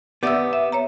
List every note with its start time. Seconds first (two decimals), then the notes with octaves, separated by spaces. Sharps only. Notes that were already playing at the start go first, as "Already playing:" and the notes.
0.23 B3 G4 D5 E5 E6
0.53 E5
0.72 C#5 E5 A#5